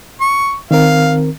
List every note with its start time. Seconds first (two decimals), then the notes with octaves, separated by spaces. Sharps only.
0.21 C#6
0.71 D#3 C4 A#4 F5